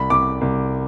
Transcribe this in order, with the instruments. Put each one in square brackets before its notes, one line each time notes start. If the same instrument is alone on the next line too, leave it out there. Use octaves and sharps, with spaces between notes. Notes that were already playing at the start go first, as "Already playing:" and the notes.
Already playing: [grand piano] C2 B5
C2 D6
C2